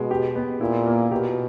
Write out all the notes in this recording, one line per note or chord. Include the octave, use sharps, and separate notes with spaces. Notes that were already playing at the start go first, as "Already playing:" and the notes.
Already playing: B2 G#3
G4
B3
A#2 E4
A#3
B2 G4